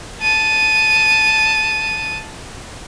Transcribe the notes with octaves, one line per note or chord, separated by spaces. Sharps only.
A5 D#7